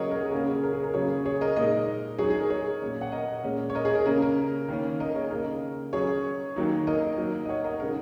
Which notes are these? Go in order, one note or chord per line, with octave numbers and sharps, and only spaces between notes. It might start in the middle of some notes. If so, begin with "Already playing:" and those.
Already playing: C#3 F#3 C#4 G#4 A#4 C#5 D#5 F#5
A#4
G#4
C#3 A#3 C#4 A#4
G#4 C#5
A#4
G#4
A#4
C#3 F#3 A#3 C#4 G#4 C#5
G#4 C#5
A#4 D#5
A#2 G#3 D#4 A#4 D#5
F#3 D#4 G#4 C#5
G#4
A#4
G#4 C#5
A#2 A#3 C#4
F#5
A#4 D#5
A#2 G#3 C#4
C#5
A#4 D#5
G#4 C#5
A#4
C#3 A#3 C#4 A#4
A#4
D#3 A#3 C#4
A#4 D#5
G#4 C#5
C#3 A#3 D#4 A#4 D#5
F#3 C#4 G#4 C#5
D#3 F#3 A#3 D#4
A#4 D#5
F#3 A#3 D#4
D#5
C#5 F#5
A#4 D#5
C#3 G#3 D#4 A#4